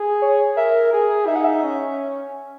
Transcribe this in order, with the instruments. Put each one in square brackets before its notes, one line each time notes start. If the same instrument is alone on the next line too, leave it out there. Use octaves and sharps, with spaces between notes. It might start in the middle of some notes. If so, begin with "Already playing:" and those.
Already playing: [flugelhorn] G#4
[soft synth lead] C#5
[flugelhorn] A#4 [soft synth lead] E5
[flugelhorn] G#4
[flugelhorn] D#4 [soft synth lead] E5
[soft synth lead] F#5
E5
[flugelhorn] C#4